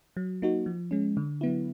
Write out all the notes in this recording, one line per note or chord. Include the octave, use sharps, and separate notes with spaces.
F#3
A#3 D#4 F#4
F3
G#3 C#4
D3
F#3 B3 E4